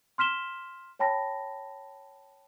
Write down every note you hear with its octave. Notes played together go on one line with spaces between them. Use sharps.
C6 F6 B6 E7 G7
C#5 G5 A5 B5 A#6